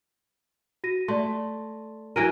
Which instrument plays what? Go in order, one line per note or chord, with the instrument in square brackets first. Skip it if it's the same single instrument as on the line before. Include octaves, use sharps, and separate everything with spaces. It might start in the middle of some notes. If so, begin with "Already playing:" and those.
[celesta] F#4 A#6 D#7
[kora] A3 [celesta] D5 C6
[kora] E3 F#3 A#4 [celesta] G#5 D7 D#7